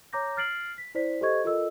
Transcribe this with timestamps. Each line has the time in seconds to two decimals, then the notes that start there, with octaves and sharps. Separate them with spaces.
0.13 C#5 A#5 D6 G6 A#6
0.37 F6 A6 C7 D7 F#7
0.78 B6
0.95 E4 C5 D5 B6
1.21 G4 A4 C5 D#5 C#6 G#6
1.44 F4 A4 A#4 D#5 E6